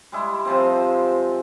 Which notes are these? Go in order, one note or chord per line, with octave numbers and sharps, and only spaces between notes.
G3 G#3 E4
C3 F3 C4